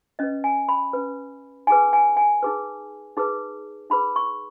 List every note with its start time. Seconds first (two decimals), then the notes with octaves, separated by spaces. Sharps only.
0.19 C#4 B4 D#5
0.44 G#5
0.69 B5
0.93 C#4 B4
1.67 D#4 G#4 B4 G#5
1.93 G#5
2.17 G#5
2.43 D#4 G#4 B4
3.17 D#4 G#4 B4
3.90 D#4 G#4 B4 B5
4.16 C#6